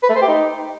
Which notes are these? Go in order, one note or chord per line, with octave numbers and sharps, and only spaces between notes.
B4
A3
C5
G4
D#4